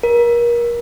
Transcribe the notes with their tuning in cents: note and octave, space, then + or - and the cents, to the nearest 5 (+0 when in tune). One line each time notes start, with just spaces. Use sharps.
A#4 +30